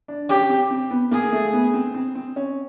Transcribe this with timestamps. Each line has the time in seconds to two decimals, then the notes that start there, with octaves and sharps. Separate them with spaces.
0.08 D4
0.29 C#4 G4
0.49 C4
0.71 C4
0.91 B3
1.11 A#3 G#4
1.32 A3
1.53 B3
1.74 C4
1.94 C4
2.15 C4
2.36 C#4